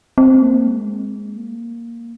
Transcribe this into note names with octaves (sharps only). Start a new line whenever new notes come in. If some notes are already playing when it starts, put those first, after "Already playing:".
C4
A#3
G#3
A#3